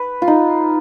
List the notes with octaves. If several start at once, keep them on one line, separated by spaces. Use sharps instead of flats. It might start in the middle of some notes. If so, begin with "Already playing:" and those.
Already playing: B4
F4
D#4